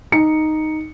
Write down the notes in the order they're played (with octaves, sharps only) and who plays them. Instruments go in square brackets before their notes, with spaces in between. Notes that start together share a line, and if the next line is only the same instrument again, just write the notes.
[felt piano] D#4 C#7